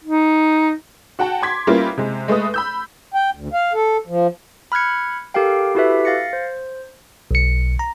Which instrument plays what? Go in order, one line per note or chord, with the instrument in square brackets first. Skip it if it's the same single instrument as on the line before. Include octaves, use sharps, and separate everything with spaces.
[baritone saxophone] D#4
[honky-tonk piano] F#4 F#5 G5 A5
C6 D6 G#6 B6
G3 A#3 B3 C#4 E4 F4
C3 G#3
G#3 A3 B4 D#6
B5 E6 G6
[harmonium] G5
D2
F5
A4
F3
[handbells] B5 F6 F#6 G#6 C#7
G4 A4 A#4 F5 G5
E4 F#4 G4 A4 B4 E5
F5 A6 A#6 C#7
C5
[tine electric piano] B1 C#7
A#5